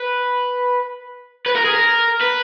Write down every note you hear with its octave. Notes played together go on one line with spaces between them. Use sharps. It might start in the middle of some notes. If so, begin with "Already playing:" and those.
Already playing: B4
B4
A#4
G#4
A#4
B4